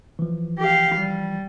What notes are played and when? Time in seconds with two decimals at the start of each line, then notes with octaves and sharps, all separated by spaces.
0.19 E3 F3
0.59 G4 F5
0.95 G3